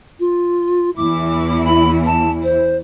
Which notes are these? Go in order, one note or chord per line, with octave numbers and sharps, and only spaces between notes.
F4
E2 E3 E4 D6
B5
A5
C5